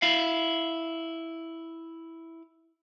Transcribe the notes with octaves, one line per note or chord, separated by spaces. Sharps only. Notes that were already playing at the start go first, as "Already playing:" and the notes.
E4 F5